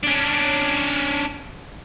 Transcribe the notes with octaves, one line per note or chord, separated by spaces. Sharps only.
C#4 D4